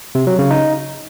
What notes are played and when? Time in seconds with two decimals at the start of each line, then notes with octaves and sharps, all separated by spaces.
0.15 C3
0.27 F#3
0.39 C#3
0.51 D#4